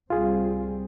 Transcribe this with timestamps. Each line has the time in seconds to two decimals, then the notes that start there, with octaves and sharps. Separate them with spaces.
0.10 C2 G3 C4 F4 G#4